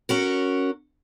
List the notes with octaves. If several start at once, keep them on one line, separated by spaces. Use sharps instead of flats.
C#4 F#4 A#4